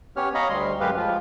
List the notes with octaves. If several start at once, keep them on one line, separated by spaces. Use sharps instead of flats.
B3 C#4 G4 C#5 F6
C#5 D#5 F5 A#5 B5 C#6
D2 G3 C6
F#2 G#3 G4 B4 F5
F3 G#3 F4